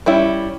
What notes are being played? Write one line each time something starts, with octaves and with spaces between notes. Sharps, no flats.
G3 C#4 E4